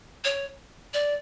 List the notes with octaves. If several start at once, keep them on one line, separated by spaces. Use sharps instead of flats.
C#5
D5